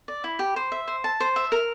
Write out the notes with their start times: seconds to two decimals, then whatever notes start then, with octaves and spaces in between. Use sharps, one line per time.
0.08 D5
0.24 E4
0.39 G4
0.56 C5
0.72 E5
0.88 C5
1.04 A5
1.20 C5
1.36 E5
1.52 A#4